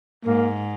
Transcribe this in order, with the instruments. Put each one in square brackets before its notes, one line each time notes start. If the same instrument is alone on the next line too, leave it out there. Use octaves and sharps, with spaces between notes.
[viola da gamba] G#2 [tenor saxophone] A#3